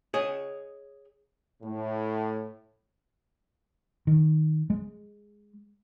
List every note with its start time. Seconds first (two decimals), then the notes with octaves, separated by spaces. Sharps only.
0.14 G#4 C#5 D#5
1.63 A2
4.07 D#3
4.70 G#3